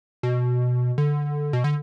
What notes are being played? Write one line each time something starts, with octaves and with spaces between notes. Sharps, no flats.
B2
D3
B2
D3